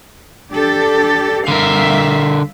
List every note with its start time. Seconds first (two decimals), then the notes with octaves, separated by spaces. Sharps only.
0.53 D4 G4 A4
1.48 D3 G3 A#4 E5 F5